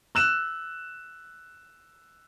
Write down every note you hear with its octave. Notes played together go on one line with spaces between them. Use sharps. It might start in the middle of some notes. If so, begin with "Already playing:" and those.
E6 F#6 E7